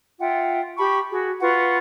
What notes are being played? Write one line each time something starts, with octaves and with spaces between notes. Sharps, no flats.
F4 E5 F#5 G5
G4 A5 B5 C#6
F#4 G#4
F4 B4 F#5 C#6